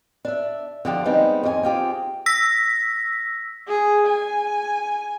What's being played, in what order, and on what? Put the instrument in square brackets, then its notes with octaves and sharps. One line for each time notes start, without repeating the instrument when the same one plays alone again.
[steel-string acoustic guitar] D4 E5
D3 F3 G4
G3 G#3 B3 C4 D#4
F2 F4 G#5
C4 F4 G4 G#4
[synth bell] E6 A#6 B6
[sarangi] G#4
G#5